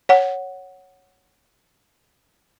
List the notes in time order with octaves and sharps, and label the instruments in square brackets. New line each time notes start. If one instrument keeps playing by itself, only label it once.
[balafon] C#5 F#5